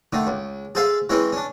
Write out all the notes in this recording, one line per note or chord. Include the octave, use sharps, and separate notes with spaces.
D3 D#3 A3
C#2
G#4 A4 C5 E5 F5
E3 G#3 C4 C#4 E4
C#4 D4